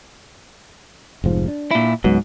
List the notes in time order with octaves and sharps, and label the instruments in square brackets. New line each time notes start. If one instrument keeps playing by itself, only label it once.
[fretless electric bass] F1 G#2 F3
D4
[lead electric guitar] A#2 E4
[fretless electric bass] C#2 F#3 B3 [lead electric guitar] G#2